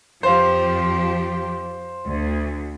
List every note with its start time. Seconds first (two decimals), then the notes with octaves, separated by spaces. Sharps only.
0.23 F2 F3 G4 C5 F5
2.07 D2